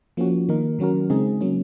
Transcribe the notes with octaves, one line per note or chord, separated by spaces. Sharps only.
F3 A#3 C#4 F#4
D#3 A#3 D#4 A#4
D#3 F#3 C#4 F#4 A#4
C#3 G#3 C4 D#4 G#4
F#3 A#3 C#4